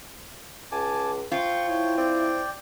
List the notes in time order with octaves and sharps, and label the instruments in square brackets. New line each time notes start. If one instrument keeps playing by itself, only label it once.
[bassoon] C#2 [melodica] G#5 A5 D6
[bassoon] F3 [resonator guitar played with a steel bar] F4 [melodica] G5 C#6
[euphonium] E4 [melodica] C#5 G5
[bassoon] C4 [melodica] D5 G5